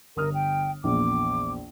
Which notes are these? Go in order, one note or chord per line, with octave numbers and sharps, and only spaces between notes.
G1 A#4 D#6 F6
G5
A#1 E2 A#2 D6